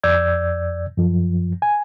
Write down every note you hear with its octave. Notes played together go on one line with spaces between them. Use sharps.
F2 D5 E6 G6 G#6
F#2 F3
G#5